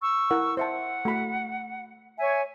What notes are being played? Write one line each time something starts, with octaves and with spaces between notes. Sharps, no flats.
C#6 E6
E4 A#4 F#5
C5 E5 F#5 A5
A3 F#4 B5
C#5 E5 G#5